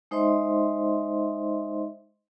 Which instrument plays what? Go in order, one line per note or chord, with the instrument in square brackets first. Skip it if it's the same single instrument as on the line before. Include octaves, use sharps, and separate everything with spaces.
[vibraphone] G#3 D#4 C5 D#5 E5 C6